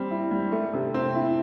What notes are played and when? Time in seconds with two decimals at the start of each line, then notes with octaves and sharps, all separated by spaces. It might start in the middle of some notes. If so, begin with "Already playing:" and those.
Already playing: G3 C4
0.11 E4
0.31 G3
0.52 A3
0.73 C3
0.94 C4
1.15 E4